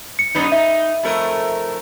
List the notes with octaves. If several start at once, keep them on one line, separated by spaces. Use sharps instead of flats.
C#7
F#2 B3 D#4
D#4 E5
F2 A3 A#4